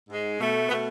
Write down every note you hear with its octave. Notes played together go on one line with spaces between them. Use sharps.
G#2 G#3
B2 A3
B2 A3 B3